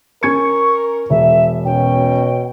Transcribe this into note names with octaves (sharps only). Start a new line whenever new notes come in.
C#4 A#4 C#6 G#6 C#7
E1 E5
B2 C#4 C#5 G5